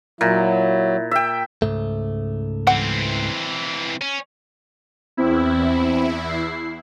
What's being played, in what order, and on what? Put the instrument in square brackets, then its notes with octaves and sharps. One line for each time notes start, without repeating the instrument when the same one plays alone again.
[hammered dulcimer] A#2 [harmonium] F#3 [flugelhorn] E4
[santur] E5 G5
[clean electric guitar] C#2 G#2 A3
[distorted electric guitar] E3 C4 [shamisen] F#5
[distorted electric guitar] C#4
[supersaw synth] E2 E4 [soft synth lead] C4
[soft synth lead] C7